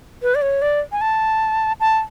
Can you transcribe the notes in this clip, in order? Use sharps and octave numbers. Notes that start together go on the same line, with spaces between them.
B4
D5
C#5
D5
G#5
A5
A5